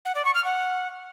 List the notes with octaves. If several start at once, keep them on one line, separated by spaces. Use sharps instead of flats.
F#5
D5
C#6
F6
F#5